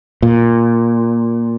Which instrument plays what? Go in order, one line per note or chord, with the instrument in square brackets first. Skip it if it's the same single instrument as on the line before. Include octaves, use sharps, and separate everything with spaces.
[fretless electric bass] A#2